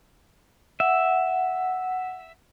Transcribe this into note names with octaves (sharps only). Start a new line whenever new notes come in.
E5 F#5